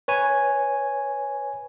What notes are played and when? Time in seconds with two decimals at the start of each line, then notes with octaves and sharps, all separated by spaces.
0.08 B4 C#5 G#5